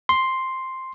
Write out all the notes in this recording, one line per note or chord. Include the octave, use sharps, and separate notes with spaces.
C6